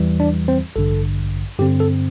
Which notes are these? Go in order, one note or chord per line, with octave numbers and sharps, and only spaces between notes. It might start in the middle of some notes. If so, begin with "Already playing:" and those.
Already playing: E2 E3 G3
D4 D5
C4 C5
A1 G2 D3 A4
G2 D3 C4 G4
A4